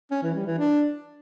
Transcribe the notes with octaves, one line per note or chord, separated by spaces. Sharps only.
C#4
E3
G3
E3
D4